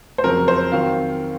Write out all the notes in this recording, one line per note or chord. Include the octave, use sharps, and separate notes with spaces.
C5
F2 C#3 F#3 A#4
C5
D#3 F#3 C4 F5